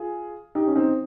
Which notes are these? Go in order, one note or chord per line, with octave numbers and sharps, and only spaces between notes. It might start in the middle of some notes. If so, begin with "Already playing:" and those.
Already playing: F4 G#4
D#4 G4
C#4
C4 D#4